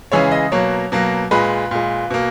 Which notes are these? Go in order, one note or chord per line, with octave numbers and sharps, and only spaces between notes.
C#3 E3 G#3 C#5
D#5
B2 F#3 A#3 C#5
B2 F#3 A#3
A#2 G#3 B4
A#2 G#3
B2 A#3